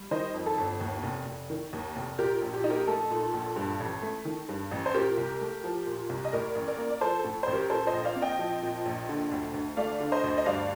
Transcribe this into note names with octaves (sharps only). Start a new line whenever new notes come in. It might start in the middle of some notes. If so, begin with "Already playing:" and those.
Already playing: G3
D#3 C5 D#5
F2
A4
G1
D#2
F1
F1
D#3
D#2
F1
A#2 G4 A#4
A#1
G4
D#4
G4 A#4
A3 A4
A#2
A#1
G2
A1
A3
D#3
G2
A1
C5
A#2 G4 A#4
C2
A3
F3
A#2
C2
D#5
A2 A#4 D5
A1
A#4 D5
A#3
D5
F3 A4 C5
A4
A2
A1 C5
G4 A#4
A#2 A4 C5
C5 D#5
A#1
D5 F5
C4
D#5 G5
F3
A#2
A#1
D3
D2
D2
A3 D5 F5
D3
C5 D#5
D2
D#5
G2 D5 F5